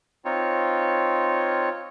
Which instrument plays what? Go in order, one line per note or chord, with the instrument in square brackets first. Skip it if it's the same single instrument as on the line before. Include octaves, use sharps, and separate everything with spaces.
[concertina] C4 D#4 F4 C#5